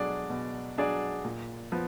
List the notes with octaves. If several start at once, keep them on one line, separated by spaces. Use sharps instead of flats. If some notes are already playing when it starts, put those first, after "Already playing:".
Already playing: B2 F#3 D4 G#4 D5
B2
F#3 D4 G#4 D5
A#2
F3 B3